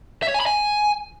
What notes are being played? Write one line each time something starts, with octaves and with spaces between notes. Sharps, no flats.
E5
C#5
G#5
B5
G#5